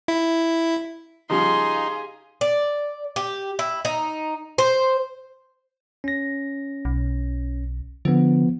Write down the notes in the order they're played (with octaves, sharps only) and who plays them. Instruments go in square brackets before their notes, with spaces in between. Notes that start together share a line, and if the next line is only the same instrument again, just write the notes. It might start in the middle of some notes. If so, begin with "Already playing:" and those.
[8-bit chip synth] E4
[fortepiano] C#3 F3 G3 [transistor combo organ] D#4 [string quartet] G4 G#4 F5 [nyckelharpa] C6
[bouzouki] D5
G4
E4
D#4
C5
[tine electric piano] C#4 A#6
[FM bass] B1
[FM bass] D3 [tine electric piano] F3 B3